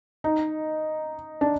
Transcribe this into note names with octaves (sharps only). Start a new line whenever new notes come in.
D#4
D4